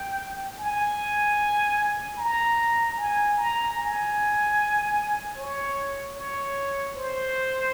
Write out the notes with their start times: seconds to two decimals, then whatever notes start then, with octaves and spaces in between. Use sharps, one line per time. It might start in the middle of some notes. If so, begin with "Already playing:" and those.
Already playing: G5
0.59 G#5
2.18 A#5
2.97 G#5
3.38 A#5
3.78 G#5
5.37 C#5
6.16 C#5
6.96 C5